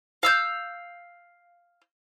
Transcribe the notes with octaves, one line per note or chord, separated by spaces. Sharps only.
F5 E6 G6